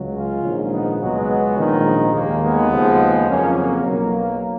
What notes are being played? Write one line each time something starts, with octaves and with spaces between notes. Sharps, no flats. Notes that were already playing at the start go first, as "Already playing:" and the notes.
Already playing: C#2 C#3 F#3
C#4 F4
A#1 G#2 D#3
B3 D#4
C#2 B2 F#3 G#3 B3
A#1 G#2 D#3
D#2 D#3 G#3 A#3
G#3 B3
D#2 C#3 F3 G#3
F2 C#3 F#3 A#3 C#4
A#3
B1 B2 F#3 A#3